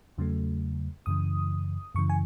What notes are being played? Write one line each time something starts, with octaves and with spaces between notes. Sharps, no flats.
E2 C#3 F#3 A3
F#2 C#3 E3 D#6
F#2 C#3 E3 C#6
G#5